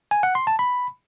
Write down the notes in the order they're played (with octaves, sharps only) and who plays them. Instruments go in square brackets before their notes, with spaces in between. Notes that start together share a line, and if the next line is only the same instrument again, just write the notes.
[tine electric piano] G#5
F#5
C6
A5
B5